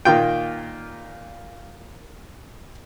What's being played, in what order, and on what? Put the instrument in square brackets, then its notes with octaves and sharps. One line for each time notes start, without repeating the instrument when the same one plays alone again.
[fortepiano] A#2 D#3 A#3 F4 G5